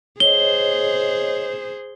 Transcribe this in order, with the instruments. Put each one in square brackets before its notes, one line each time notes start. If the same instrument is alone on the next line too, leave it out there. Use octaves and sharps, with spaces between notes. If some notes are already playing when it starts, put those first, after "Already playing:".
[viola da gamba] G#4 C5 [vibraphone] C#5 D#5 [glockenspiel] G7